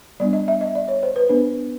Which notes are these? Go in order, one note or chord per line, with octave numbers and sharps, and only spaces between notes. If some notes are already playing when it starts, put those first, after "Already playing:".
G3 B3 D4 D5
D#5
E5
D#5
D5
C#5
C5
B4
B3 D4 B4